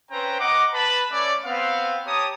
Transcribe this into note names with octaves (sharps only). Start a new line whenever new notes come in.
C4 C#4 B4 C5 G5 A#5
D#5 F#5 A#5 D6
B4 A5 B5
A3 C#4 C#5 D5
B3 C4 F5
G4 C#5 A5 A#5 D#6